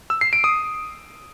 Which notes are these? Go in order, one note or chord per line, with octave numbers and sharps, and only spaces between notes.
E6
C7
D7
D#6